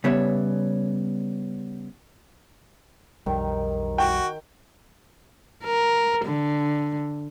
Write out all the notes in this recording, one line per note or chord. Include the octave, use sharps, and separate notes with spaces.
C#3 G3 B3 C#5 E5
B1 F2 D#3 G3
F#4 G5
A#4
D3